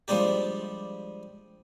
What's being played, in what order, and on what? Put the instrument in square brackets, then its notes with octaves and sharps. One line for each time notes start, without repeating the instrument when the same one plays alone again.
[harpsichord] F3 G3 G#3 D4 G4